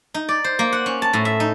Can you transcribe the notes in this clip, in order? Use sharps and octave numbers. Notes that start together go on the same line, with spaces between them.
D#4
D5
C5
A#3
F#5
C#4
A5
A2
E5
D#4